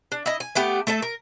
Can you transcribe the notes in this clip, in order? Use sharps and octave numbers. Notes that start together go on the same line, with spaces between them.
D4
E4 D#5
G#5
A3 B3 G4
A3 A4 E5
A#4